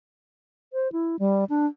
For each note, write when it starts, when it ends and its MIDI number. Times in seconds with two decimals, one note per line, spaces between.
0.73 0.91 72
0.92 1.16 64
1.19 1.44 55
1.50 1.66 62